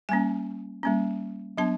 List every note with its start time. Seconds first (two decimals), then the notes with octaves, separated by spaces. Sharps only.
0.09 G3 A#3 C#4 G#5
0.83 G3 A#3 C#4
1.58 F#3 B3 D4 A5